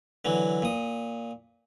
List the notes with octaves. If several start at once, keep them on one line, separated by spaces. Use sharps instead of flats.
D3 E3 F#3
A#2 D#6